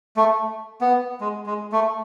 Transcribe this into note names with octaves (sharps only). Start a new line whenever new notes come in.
A3
B3
G#3
G#3
A3